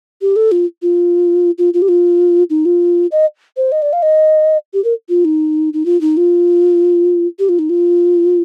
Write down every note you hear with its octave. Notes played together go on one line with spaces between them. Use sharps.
G4
A4
F4
F4
F4
F4
G4
F4
D#4
F4
D#5
C5
D#5
D5
F5
D#5
G4
A#4
F4
D#4
D#4
F4
D#4
F4
G4
F4
D#4
F4